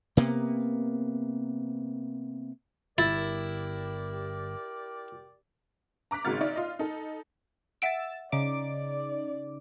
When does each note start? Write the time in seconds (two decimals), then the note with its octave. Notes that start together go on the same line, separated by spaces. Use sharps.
0.17 C3 A#3 B3
2.98 G1 E4 G4 A#4 D5 A6
6.11 A#5 D6 F#6 B6
6.25 G#1 G#2 C#3 F#4 F6 A6
6.41 D#4 D5 E5
6.56 F4 D#5
6.79 D#4 A4
7.82 E5 F#5 E6 A6 D7
8.32 C#3 D#4 D5 D6